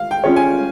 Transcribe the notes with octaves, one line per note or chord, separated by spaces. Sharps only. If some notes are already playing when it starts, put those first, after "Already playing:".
Already playing: F5
G5
C#4 F4 G#4 C#5
G#5